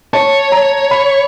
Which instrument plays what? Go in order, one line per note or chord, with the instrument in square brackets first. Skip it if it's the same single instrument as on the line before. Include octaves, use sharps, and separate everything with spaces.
[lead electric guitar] C#5 [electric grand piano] A5
[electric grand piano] A#5
B5